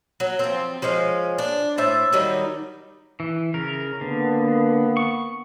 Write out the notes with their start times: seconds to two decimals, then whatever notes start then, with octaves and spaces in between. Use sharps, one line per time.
0.20 F#3
0.39 F3 C4
0.82 F3 G#3 C#4 F5
1.38 D4
1.78 A2 C5 E5 A5
2.13 D#3 F#3 G3 D#4
3.20 E3
3.54 C#3 A#4
4.01 D3 A#3 B3
4.97 C#6